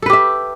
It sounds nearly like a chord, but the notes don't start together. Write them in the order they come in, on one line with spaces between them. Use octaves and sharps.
A4 B4 G4 E5